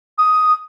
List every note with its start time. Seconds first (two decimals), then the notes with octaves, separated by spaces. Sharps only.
0.18 D#6